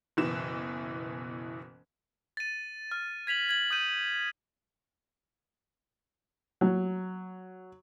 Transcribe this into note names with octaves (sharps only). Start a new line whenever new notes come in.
F#1 B2 E3 E7
A6 D#7
F6
G#6 B6 F7 F#7
G#6 F#7
D#6 G6 D#7
F#3